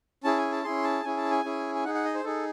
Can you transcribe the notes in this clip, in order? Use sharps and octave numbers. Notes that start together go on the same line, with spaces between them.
C#4 E4 G#4 A5
G#5
A5
C#4 E4 G#4 C6
A5
C#4 E4 G#4 G#5
A5
G#5
C#4 E4 G#4
G#5
D#4 G#4 F#5
F#5
D#5
C5
D#4 G#4 A4